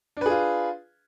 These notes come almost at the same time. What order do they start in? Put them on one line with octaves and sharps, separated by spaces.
D4 B4 G#4 F4